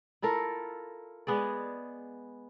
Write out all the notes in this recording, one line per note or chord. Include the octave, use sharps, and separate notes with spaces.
E4 F4 A4 A#4
G#3 B3 G#4 D5